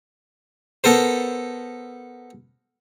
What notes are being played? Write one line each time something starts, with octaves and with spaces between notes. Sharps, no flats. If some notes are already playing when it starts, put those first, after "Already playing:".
B3 A4 A#4 C5